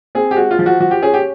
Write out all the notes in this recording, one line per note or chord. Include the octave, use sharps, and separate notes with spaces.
C4 G#4
G4
G#3 F#4
F4
F3
F#4
F3 F#4
G4
C#4 G#4
G4